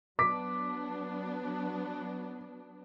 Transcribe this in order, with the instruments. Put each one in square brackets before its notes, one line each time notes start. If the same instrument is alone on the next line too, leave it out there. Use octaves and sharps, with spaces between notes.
[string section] F#3 B3 D4 [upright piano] D6 B6